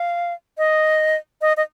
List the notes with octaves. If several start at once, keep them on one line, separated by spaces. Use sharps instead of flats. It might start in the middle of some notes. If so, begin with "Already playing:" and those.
Already playing: F5
D#5
D#5
D#5